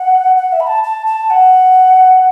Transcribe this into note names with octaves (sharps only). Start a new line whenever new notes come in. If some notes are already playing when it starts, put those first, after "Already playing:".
Already playing: F#5
F#5
E5
B5
A5
A5
A5
F#5